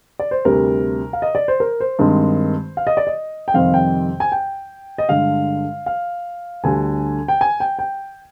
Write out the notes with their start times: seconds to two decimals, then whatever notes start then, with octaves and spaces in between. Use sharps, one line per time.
0.19 D5
0.31 C5
0.45 D2 C3 G3 A#4
1.13 F5
1.22 D#5
1.35 D5
1.48 C5
1.60 A#4
1.80 C5
1.99 G2 D#3 G#3 C4
2.77 F5
2.87 D#5
2.97 D5
3.07 D#5
3.48 G5
3.54 F2 C3 D#3 G3 C4 F5
3.74 G5
4.20 G#5
4.32 G5
4.98 D#5
5.09 G2 D3 G#3 F5
5.86 F5
6.63 D2 D3 G3 G#5
7.28 G5
7.41 G#5
7.60 G5
7.79 G5